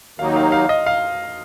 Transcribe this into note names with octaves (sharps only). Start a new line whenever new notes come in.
D#2 D#3 F#3 A#3 D#4 F5
F5
F5
D#5
F5